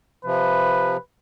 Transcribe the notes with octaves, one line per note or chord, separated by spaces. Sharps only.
C3 F3 B4